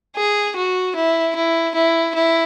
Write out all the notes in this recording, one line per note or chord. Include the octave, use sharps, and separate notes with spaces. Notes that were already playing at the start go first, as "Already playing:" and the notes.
G#4
F#4
E4
E4
E4
E4